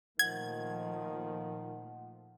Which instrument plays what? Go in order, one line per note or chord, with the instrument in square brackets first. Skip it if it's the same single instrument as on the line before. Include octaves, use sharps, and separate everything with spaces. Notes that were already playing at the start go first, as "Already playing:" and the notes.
[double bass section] A#2 F3 A3 [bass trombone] D#3 [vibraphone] F#5 [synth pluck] G#6